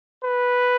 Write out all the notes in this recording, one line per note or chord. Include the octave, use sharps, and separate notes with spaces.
B4